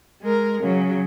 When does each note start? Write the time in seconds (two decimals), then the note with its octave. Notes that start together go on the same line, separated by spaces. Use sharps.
0.21 G#3 A#4
0.62 C#3 F#3